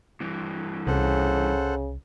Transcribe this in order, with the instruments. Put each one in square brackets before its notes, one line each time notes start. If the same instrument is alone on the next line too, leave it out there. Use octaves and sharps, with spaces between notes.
[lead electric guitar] G2 E3
[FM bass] C2 [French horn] C#3 [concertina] A4 C5 F#5